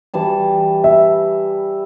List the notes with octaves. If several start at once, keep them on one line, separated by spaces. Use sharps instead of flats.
E3 G3 A5
E5